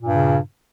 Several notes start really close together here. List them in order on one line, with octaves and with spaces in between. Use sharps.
A#2 G2 C#3